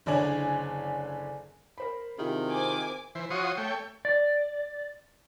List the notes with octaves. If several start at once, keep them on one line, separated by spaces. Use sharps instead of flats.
F#1 D3 C#5 D5 G#5 F#7
A#4 C5 B5
C3 D#3 E4 F4 G#4
C4 G#5 D6
E3 C5
F3 F#4 C#5 C6 D#6
A3 C#5 G5
D5